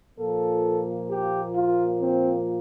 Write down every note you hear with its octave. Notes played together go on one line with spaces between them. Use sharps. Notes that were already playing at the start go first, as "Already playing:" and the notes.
A#2 F3 A#3 A4
G4
F4
C4